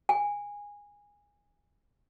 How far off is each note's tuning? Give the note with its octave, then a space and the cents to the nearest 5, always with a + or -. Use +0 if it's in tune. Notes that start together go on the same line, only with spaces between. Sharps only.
G#5 -20